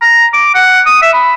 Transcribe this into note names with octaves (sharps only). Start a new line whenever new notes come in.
A#5
D6
F#5
D#6
E5
B5